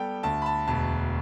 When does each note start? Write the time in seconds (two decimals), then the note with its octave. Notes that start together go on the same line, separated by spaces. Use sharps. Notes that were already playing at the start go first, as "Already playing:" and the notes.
Already playing: G3 B3 G4 A4 G5
0.23 D2 A5
0.42 B5
0.46 A5
0.68 E1 A5